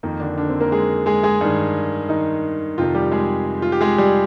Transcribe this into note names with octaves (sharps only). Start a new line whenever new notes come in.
F2 D#3 A#3
D3 D4
D3 D4
C4
A#3 A#4
G#3 G#4
G#3 G#4
G#3 G#4
G2 D#3
D#3 D#4
F2 C3 D#3 F3 F4
G3 G4
G#3 G#4
F4
G4
G#3 G#4
G3 G4